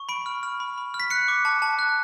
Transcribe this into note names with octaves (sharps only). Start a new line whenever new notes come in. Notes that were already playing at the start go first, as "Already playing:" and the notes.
Already playing: C#6
B5 D7
F6
F6
B5
B5
F6
B6
F#6 C#7
D6
A5
A5
F#6